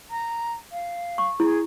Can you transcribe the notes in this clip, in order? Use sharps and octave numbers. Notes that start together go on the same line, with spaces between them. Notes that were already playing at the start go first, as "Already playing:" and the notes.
A#5
F5
C#6
E4 G#4